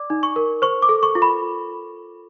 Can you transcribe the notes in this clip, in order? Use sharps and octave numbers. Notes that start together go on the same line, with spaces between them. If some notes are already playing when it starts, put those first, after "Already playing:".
Already playing: D5 D6
D#4
C#6
A#4
C5 C#6
D6
A4
C#6
F4
B5